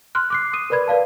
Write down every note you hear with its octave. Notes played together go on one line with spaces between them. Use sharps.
C6 F6 F#6
D6 F#6 C7
D#6 D#7
A#4 B4 D5 B5 G#6
B4 D5 F5 A5